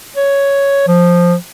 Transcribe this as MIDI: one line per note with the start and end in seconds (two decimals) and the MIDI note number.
0.16 0.84 73
0.87 1.35 53